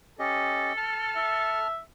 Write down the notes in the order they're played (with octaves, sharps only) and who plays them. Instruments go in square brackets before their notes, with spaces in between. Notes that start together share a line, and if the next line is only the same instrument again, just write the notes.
[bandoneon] C#4 G4 D#5 [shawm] A4
[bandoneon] A5 F6
[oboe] E5